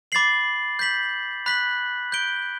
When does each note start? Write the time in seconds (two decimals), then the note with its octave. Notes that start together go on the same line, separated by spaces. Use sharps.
0.12 B5 D6 A6 C7 F#7
0.79 G6 B6 F#7
1.46 B5 F#6 B6 F#7
2.12 G6 D7 G7